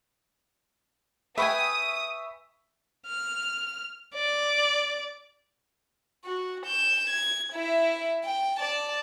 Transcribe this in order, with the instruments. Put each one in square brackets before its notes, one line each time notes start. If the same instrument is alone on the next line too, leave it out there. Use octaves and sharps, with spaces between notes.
[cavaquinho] B4 G5 G#5 [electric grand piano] E5 C#6 B6 [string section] D#6
[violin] F6
D5
F#4
G6 E7
G#6
E4 E5
G5
D5 A5